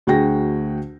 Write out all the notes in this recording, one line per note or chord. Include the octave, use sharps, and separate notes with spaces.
D2 F#4 G#4 G5 A#6